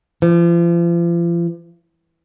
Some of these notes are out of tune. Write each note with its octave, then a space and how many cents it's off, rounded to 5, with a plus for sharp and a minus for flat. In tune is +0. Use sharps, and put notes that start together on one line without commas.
F3 -40